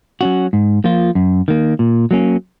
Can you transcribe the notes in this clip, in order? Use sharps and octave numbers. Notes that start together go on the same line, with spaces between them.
F#3 C#4 F#4
G#2
F3 A#3 F4
F#2
D#3 A#3
A#2
F#3 A#3 C#4